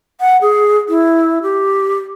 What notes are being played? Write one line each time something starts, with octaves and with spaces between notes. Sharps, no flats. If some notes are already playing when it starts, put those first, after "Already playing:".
F#5
G#4
E4
G4